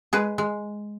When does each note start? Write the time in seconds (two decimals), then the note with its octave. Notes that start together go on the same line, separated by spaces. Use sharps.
0.13 G#3 G#4 B4
0.38 G#3